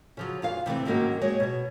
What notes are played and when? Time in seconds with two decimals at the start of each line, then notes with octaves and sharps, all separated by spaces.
0.17 C#3 F3 F#3
0.42 E2 F4 F5
0.66 C3 E3 A3 C4
0.85 G#2 D#3 F#3 A#3 C#4 F#4
1.21 F#3 G#3 C#5
1.40 B2 C#5